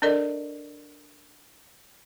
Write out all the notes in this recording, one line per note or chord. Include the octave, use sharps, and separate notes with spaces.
D4 A4 A#4 D5 D#5